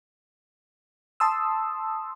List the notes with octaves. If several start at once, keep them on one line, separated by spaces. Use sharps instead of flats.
A5 C6 D#6 E6